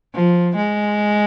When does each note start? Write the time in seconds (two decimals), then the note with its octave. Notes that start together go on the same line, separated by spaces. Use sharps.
0.15 F3
0.56 G#3